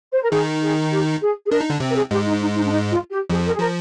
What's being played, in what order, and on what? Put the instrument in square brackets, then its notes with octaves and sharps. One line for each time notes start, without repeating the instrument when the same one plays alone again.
[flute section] C5
A#4
[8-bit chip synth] D#3 D#4 [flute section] G#4
[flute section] G#4
G4
G#4
G#4
[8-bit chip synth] D4 [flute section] A#4
[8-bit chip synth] D#4
D3 D4
C3 C4
[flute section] A#4
G#4
[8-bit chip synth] G#2 G#3 [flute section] G4
[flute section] D#4
D#4
D#4
D4
D#4
F4
G4
[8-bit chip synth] F2 F3 [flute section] G#4
[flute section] A#4
G#4
[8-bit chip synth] F3 [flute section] A#4